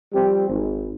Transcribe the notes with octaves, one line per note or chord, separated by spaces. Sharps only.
F3 G3 C4 G4
G#1